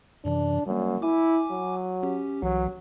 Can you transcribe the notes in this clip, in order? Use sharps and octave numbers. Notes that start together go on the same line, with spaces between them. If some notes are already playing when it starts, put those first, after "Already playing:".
F#2 C3 E3 D4
F#2 G3 A#3
E4 G#5 D6
F#3
C#4 G4
C2 E3 F#3